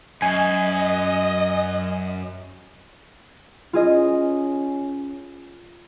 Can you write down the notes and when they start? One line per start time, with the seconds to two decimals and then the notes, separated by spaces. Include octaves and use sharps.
0.22 F#2 D#5 G#5
3.73 C#4 F4 G#4 D#5